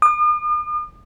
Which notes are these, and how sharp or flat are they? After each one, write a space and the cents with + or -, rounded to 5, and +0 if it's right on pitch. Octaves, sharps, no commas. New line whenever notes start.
D#6 -45